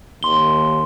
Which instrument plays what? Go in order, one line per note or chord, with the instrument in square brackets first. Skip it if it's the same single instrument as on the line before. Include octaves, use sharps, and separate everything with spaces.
[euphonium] D#2 [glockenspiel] C6 G7